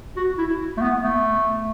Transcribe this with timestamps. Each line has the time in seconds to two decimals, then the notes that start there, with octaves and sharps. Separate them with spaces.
0.16 F#4
0.38 E4
0.77 A3
0.81 B3
1.03 A3